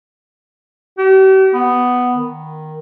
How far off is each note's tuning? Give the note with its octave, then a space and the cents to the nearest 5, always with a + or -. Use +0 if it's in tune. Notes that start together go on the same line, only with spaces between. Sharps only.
G4 -45
B3 +5
D#3 -5